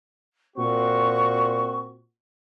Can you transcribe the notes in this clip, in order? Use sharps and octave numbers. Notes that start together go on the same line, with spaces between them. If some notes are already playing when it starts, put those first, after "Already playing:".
A#2 C4 F#4 C#6